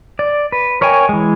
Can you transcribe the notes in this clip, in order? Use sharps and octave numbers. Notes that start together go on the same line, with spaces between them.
D5
B4
A#4 C#5 D#5 G5 G#5
E3 G#3